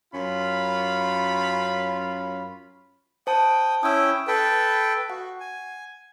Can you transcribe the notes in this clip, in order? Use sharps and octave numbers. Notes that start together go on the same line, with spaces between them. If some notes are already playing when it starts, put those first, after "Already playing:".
F#2 C#4 F4 B5
C5 G5 A5 D#6
C#4 E4 G5 D#6 E6
A4 B4 G5
F#4 F#5
G#5